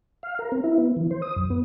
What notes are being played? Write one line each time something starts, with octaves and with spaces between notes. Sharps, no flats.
F5
A#4
C4
E4
B3
E3
C5
D#6
F#2
B3